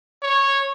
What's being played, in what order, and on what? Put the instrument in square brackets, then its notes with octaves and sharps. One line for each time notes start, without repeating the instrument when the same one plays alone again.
[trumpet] C#5